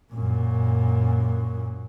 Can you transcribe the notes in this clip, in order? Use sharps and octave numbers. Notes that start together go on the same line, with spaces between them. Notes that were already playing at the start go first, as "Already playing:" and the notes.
F#2 A#2